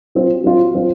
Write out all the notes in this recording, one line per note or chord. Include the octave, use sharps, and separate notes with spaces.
F#3 C4 F4
F#3 C4 F4
F#3 C4 F4